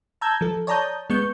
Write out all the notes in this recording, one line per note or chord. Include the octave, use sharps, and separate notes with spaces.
A5 A#5 E6 G6 G#6
F3 A4
C#5 D5 A5 A#5 D#6 G6
G#3 B3 C#6 G6